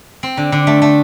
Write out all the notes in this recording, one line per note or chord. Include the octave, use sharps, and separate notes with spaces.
C4
D3
D3
A3
A3